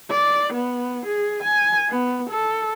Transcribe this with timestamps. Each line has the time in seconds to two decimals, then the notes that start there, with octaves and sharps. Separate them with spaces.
0.11 D5
0.53 B3
1.07 G#4
1.43 G#5
1.89 B3
2.30 A4